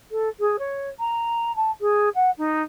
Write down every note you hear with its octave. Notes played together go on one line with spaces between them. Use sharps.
A4
G#4
C#5
A#5
A5
G#4
F#5
D#4